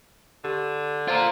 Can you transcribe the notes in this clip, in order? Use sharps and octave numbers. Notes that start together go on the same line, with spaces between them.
D3 G4
F4 A#4 C5 A#5